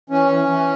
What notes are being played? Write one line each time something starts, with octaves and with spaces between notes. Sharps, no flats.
E3 C#4
E3
E3